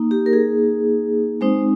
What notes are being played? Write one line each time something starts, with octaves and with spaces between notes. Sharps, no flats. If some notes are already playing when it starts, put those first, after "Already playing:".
Already playing: A#3 D#4
G4
A#4
G#4
G#3 C4 D#4 C5